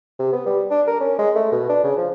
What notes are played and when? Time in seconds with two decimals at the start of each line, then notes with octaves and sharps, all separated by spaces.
0.19 C3
0.33 B3
0.46 G3
0.70 D4
0.87 A#4
1.01 C#4
1.19 G#3
1.35 A3
1.52 B2
1.69 D4
1.84 C#3
1.98 F3